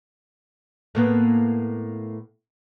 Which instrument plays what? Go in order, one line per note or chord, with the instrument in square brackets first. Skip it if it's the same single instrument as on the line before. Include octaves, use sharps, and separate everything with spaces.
[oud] A2 A#3 B3